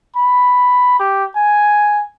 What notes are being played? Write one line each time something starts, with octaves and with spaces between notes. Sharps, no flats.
B5
G4
G#5